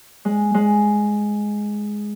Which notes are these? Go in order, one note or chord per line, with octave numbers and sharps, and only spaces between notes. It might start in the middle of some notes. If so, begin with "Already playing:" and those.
G#3
G#3